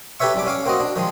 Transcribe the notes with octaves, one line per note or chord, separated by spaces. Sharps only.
G4 A4 B4 C#5 E5 C#6
C2 G3 D6
C#4 F5 D6
A#3 C4 F#4 D#5
D4
D#3 F3 G#3